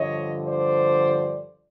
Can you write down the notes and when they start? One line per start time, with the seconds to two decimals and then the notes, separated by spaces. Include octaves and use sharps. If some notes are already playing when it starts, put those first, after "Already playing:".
Already playing: G2 D3 F3 C#5 D#5
0.48 C5 D5